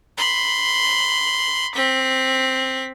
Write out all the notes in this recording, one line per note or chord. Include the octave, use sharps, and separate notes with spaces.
B5 C6
C4 B6